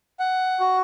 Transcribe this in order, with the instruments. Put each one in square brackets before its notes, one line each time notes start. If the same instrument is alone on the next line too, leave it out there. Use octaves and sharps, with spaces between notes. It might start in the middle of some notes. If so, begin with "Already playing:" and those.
[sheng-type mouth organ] F#5
F#4